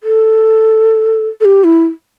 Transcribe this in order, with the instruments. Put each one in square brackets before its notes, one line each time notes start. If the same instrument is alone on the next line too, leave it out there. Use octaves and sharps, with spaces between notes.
[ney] A4
A4
G4
E4